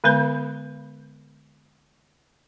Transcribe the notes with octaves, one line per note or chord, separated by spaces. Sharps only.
D3 G#3 B3 B4 B5